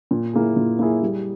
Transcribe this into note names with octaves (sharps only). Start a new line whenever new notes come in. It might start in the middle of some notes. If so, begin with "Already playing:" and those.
A#2
A#3 E4 G#4
A#2
A#3 E4 G#4
G3